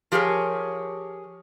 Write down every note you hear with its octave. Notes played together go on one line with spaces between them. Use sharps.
F3 G4 G#4 A#4 C#5